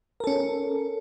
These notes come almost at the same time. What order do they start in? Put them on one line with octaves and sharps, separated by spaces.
A#4 A4 C#4